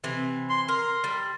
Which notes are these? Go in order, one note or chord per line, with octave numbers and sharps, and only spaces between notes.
C3 E3 C4
C6
A#4 C6
G3